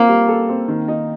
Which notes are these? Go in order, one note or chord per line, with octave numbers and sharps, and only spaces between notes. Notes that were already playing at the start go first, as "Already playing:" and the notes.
Already playing: A#3 C4 F4
G3
A4
C4
D#3
D#4